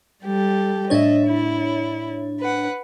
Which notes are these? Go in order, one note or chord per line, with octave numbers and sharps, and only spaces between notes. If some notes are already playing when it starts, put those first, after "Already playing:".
G3 G4 A4
A2 D4 C#5 D#5 E5
E4
B4 F#5